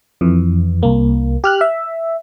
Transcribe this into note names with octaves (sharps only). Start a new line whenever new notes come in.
F2 E3
C2 A#3
G4 F6 F#6
E5